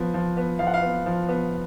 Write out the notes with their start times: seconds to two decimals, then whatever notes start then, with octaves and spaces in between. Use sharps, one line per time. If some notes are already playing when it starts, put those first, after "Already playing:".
Already playing: F3 B3
0.14 F3
0.37 B3
0.59 F3 F5
0.67 F#5
0.74 F5
0.82 B3
1.06 F3
1.29 B3